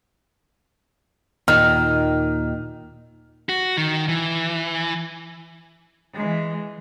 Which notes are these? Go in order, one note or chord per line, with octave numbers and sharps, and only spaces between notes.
D#2 A#2 D#3 F6
F#4
D#3
E3
E3 G#3